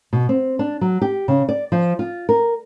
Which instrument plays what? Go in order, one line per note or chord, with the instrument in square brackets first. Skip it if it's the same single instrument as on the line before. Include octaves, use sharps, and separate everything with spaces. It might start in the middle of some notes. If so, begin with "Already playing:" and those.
[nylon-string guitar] B2
C4
D4
F#3
G4
C#3
D5
F3
F4
A#4